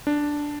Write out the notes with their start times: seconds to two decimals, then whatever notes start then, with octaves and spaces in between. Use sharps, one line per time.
0.07 D4